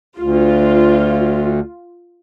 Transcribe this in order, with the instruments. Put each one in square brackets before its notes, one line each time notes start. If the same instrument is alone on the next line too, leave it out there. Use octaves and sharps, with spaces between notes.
[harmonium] D2 [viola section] F4